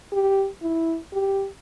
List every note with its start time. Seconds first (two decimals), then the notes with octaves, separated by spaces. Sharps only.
0.12 G4
0.62 E4
1.13 G4